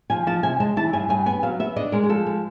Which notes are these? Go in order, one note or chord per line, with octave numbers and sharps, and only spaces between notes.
F3 G#5
F3 A5
C3 G#5
G#3 A5
E3 A5
G2 G#5
G2 G#5
B3 G#5
F#3 F5
B3 E5
D4 D#5
G#3 A#4
G#4
F3 A4
G#3